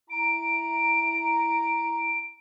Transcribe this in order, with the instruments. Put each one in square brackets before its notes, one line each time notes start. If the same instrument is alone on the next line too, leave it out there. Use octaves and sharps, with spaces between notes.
[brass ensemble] E4 A#5 [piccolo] D7